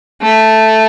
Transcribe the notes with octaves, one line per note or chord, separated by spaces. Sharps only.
A3